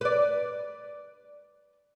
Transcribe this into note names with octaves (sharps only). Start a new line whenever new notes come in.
B4 D5